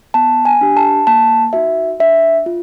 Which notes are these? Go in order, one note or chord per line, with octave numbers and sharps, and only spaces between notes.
B3 A5
G#5
D4 G4
A5
A#3 A5
D#4 F#4 E5
D4 E5
F4